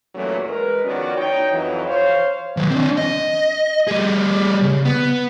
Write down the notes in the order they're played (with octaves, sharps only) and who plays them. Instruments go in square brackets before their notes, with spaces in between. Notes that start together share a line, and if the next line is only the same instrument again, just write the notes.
[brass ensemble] E2 A#2 E3 F#3 A3 C#4
G#3 A#4 B4
D#3 F3 B3 C#4 F#4 D5
D#4 C#5 G5
F2 E3 F#3
C5 C#5 F5
[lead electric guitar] D#3 F#3
C4 D4
D#5
G3 G#4
C#3
B3